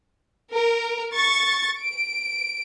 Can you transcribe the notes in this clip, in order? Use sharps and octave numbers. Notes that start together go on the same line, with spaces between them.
A#4
C#6 A6
D7